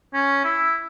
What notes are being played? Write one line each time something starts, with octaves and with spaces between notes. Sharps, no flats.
C#4
E4